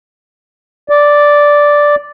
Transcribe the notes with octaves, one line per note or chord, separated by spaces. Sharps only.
D5